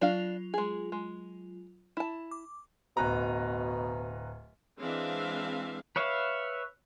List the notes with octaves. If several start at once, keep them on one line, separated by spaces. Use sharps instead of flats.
F#3 D4 F4 F5 F7
G#3 G#4
G#3
E4 A5
D6
D1 B2 B4 A#5
E3 G#3 C4 D4 E5 F5
B4 C#5 E5 F5